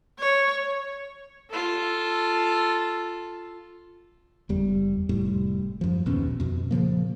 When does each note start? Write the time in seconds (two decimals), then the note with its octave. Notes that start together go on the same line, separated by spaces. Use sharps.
0.19 C#5
1.50 F4 A4
4.49 F#1 E2 G3
5.09 F1 A2 G3
5.81 F#2 F3
6.06 A#1 D#2 B2 C#4
6.40 F2 B2
6.71 A#2 C#3 F3 A#3